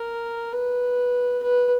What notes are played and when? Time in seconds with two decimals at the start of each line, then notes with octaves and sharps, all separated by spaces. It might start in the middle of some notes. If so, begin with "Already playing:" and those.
Already playing: A#4
0.52 B4
1.43 B4